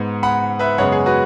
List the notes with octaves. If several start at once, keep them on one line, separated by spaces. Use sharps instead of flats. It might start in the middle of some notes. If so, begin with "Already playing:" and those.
Already playing: G#2 G#3 B3
F#5 B5
B4 E5
F#2 C#3 G#3 B3 C#5 F#5
G#4
F#4 B4